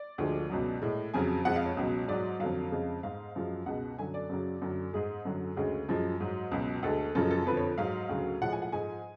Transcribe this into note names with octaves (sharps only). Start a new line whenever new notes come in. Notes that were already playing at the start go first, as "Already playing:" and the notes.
Already playing: D5
D2 D3 F3 G#3
C#2 B2 F#3
A2 G#3
F2 C#3 F#3 G#5
F2 F3 G#3 F#5
F5
C#5
C#2 B2 F#3
G#2 F#3 D5
F2 D3 F#3 F5
F2 C#3 G#3
G#2 G#3 F5
F#2 F3 G#3
C#2 B2 G#3 F#5
F#2 D3 F#3 G#5
D5
F#2 C#3 F#3
F#2 D3 F#3
G#2 G#3 G#4
F#2 D3 F#3
D2 C#3 G#3
F#2 F3 G#3
G#2 F#3
C#2 B2 F#3
D2 D3 G#3 A4
F#2 C#3 F3 G#3 A4
A4
F2 D3 F3 B4
C#5
G#2 F#3 F5
D2 C#3 F#3
A2 F3 G#3 F#5
G#5
F#5
G#2 F3 G#3 G#5